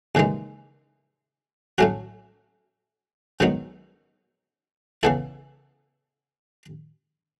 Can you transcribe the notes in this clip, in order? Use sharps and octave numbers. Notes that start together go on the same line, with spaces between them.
D#2 C#3 E3 G#3 D#4
A2 F#3 A3 C#4 F#4
G#2 D#3 F#3 B3 D#4
C#3 E3 B3 E4 A4